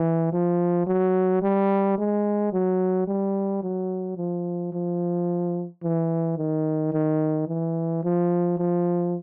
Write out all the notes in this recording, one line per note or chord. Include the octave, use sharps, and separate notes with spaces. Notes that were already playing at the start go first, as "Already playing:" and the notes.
Already playing: E3
F3
F#3
G3
G#3
F#3
G3
F#3
F3
F3
E3
D#3
D#3
E3
F3
F3